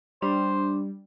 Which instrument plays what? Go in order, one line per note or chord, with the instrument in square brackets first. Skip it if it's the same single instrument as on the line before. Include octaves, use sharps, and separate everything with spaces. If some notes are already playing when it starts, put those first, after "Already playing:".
[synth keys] G3 [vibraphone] D4 [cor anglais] C5